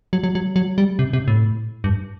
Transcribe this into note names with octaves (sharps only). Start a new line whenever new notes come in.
F#3
F#3
F#3
F#3
G3
C3
C3
A2
G2